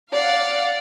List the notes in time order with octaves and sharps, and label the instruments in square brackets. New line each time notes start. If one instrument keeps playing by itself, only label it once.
[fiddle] D5 [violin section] F5 F#5